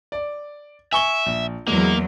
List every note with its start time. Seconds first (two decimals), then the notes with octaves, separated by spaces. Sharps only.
0.12 D5
0.93 E5 G#5 C#6 G7
1.26 A#1
1.68 E2 F#3 G#3 A#3